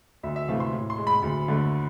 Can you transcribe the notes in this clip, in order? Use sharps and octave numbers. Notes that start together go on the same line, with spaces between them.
D2 E5
E5
C3 E3 A3 F5
C6
A2
C6
G#3
B5
D2
D3 A3